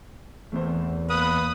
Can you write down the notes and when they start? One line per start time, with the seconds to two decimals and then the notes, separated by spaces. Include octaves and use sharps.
0.52 E2 A3 C4 C5
1.10 A#3 B4 D#6